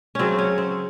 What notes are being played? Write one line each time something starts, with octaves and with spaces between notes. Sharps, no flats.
C#3 F#3 C4 C#4
C#4
C4